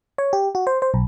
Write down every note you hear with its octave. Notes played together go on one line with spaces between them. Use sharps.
C#5
G4
F#4
C5
C5
B1